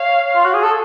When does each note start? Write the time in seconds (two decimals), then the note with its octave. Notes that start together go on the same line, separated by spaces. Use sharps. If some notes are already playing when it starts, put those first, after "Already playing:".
Already playing: C#5 F5
0.35 F4
0.46 F#4
0.54 G#4
0.63 A4